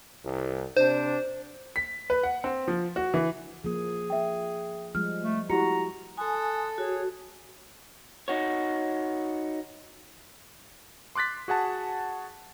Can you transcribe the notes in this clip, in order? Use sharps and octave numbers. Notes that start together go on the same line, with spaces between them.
C2
C3 D4 C5
B6
B4
F#5
C4
F3
F#4
E3
F3 A#3 G#4
E5 G5
F3 G3 G#3 F6
A3
E4 F#4 G4 A#5 C#7
A4 G#5 C6 D#6 F#6
F#4 G#4 C#5
D#4 F#4 C#5
C6 D6 F#6 A6 B6
F#4 G#4 F#5 A5